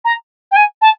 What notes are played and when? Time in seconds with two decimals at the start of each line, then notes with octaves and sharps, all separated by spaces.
0.05 A#5
0.51 G5
0.56 G#5
0.81 A5